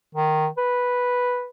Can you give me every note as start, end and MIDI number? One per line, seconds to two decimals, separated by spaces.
0.15 0.47 51
0.58 1.47 71